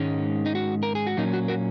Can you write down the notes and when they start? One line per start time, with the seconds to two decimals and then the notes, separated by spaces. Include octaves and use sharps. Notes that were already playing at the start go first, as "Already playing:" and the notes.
Already playing: G#2 D#3 G#3 C#4
0.46 D#4
0.55 F#4
0.83 A#4
0.95 G#4
1.07 F#4
1.17 A#2 F#3 A#3 C#4 D#4
1.34 F#4
1.48 F#4 A#4